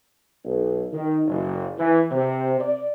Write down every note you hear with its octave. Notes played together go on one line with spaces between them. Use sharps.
B1
D#3
F#1
E3
C3
D5